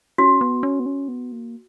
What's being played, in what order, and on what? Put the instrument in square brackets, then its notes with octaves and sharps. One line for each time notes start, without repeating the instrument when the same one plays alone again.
[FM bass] C#4 [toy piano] F#4
[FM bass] B3
C#4
B3
C#4
B3
A#3